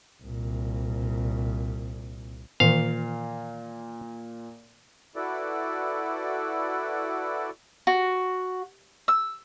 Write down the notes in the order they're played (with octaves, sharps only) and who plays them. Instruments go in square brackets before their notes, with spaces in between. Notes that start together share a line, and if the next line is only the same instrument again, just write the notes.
[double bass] C2 A#2
[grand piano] A#2 [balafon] D#3 E3 [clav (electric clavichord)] F5
[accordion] E4 F#4 A4 B4 D5
[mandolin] F#4
E6